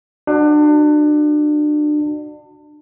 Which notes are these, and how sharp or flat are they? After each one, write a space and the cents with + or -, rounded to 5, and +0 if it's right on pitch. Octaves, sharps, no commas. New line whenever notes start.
D4 +30 F#4 +0